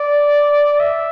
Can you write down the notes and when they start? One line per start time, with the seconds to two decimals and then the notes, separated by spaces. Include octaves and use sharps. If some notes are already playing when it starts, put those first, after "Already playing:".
Already playing: D5
0.80 E5